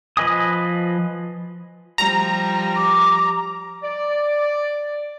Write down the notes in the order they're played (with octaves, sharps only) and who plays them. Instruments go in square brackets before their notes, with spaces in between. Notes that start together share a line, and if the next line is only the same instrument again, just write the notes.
[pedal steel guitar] F3 B4 D#5 G#5 D#6
[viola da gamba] F3 G3 [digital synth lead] A#5
[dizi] D6
[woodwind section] D5